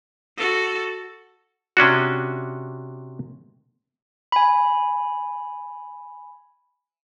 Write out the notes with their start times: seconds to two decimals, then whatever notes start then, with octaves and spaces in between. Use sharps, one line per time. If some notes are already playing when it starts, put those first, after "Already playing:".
0.37 F#4 A4
1.77 C3 C#4 D4 F#4
4.32 G#5 B5